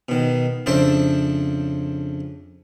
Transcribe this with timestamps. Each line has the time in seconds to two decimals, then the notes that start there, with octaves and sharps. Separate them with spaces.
0.09 B2 D#3
0.66 F2 C#3 D4 C5 E5 A5